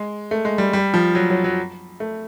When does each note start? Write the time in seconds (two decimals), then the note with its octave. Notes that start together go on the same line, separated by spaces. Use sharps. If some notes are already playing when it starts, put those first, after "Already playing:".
Already playing: G#3
0.31 A3
0.45 G#3
0.58 G3
0.73 G3
0.94 F3
1.15 F#3
1.30 F#3
1.44 F#3
2.00 A3